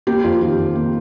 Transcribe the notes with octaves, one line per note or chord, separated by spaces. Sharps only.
A#3 G4
F2 F4
D#3 G4
F2
A#3